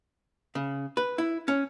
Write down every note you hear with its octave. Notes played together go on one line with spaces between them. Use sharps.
C#3
B4
E4
C#4